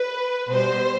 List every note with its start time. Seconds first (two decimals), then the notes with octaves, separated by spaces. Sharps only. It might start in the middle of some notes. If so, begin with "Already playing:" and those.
Already playing: B4
0.49 B2 G3 C5